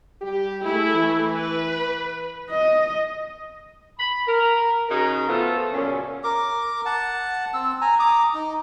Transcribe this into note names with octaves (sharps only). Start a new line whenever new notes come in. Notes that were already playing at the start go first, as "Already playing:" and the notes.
G3 G4
A3 E4 G#4
E3
B4
D#5
B5
A#4
C#3 D#4 F#4 A#4
F3 A3 B3 F4 A4
F#2 A#2 C#3 C#4
A#4 D6
F#5 A5
C4 E6
G#5 A#5
A#5 D6 D#6
D#4